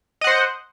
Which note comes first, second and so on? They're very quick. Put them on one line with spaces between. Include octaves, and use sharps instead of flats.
D#5 F#5 C5